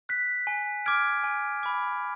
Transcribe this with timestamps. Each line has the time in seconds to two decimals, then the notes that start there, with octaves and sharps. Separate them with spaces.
0.09 F#6 B6
0.47 G#5
0.86 D6 F6 G#6 D7
1.24 G#5
1.63 B5 D6